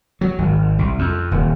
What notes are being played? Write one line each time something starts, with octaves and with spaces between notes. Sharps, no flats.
F#3
G#1
C2
F2
D#1